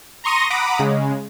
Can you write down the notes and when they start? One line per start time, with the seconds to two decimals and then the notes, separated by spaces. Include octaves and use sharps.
0.24 A#5 C6 C#6 D#6 A#6 D#7
0.50 F#5 A#5 B5 D6 D#6
0.79 C#3 G#3